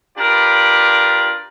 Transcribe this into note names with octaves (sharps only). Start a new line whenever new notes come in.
D4 F4 G4 A#4 B4 D5